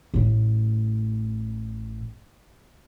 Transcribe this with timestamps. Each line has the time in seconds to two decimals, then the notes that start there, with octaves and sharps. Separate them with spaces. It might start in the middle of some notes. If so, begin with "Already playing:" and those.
0.14 A1 A2